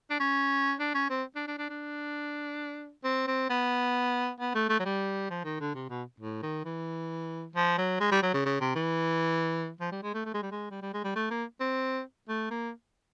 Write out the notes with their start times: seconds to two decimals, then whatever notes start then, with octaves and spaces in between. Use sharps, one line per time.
0.10 D4
0.20 C#4
0.79 D4
0.95 C#4
1.10 C4
1.35 D4
1.47 D4
1.58 D4
1.69 D4
3.04 C4
3.27 C4
3.50 B3
4.40 B3
4.55 A3
4.69 A3
4.79 F#3
4.85 G3
5.30 F3
5.45 D#3
5.60 D3
5.75 C3
5.90 B2
6.20 A2
6.43 D#3
6.65 E3
7.56 F3
7.78 F#3
8.00 G#3
8.12 G3
8.23 F#3
8.34 C#3
8.45 C#3
8.61 C3
8.75 E3
9.81 F3
9.92 G3
10.03 G#3
10.14 A3
10.26 A3
10.34 G#3
10.42 G3
10.51 G#3
10.71 G3
10.82 G3
10.94 G#3
11.04 G3
11.16 A3
11.31 A#3
11.60 C4
12.29 A3
12.51 A#3